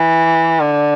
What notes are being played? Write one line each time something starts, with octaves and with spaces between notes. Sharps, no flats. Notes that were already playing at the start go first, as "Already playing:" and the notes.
Already playing: E3
D3